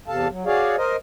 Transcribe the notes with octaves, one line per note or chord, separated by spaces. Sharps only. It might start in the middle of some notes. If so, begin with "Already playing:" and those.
E2 C3 A4 F5 A5
F#3
F#4 G#4 C#5 D5 F5
A#4 C5 D#5